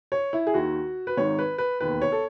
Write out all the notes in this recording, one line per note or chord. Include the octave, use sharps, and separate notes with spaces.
C#5
E4
G#4
D#2 D#3 F#4
B4
G#1 G#2 D#3 C#5
B4
B4
E1 D#2 D#3 B4
C#5
A4